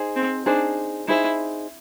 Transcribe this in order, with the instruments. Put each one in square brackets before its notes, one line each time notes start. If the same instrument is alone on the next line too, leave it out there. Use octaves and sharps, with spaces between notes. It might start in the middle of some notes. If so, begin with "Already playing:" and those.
Already playing: [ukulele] D#4 G#4 C5
[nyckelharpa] C4
[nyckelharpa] D4 [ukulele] D#4 G#4 C5
[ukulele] D#4 G#4 C5 [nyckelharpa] E4